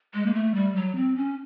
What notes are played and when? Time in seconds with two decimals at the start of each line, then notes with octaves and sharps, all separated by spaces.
0.14 G#3
0.26 A#3
0.34 A3
0.55 G3
0.76 F#3
0.96 C4
1.16 C#4